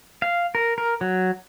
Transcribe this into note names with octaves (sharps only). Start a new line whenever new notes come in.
F5
A#4
A#4
F#3